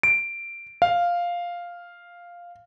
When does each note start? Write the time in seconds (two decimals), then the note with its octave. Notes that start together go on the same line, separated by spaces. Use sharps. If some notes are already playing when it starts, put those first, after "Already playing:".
0.03 D7
0.82 F5